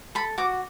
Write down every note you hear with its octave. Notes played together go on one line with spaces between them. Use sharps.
A4 B5
F#4 D6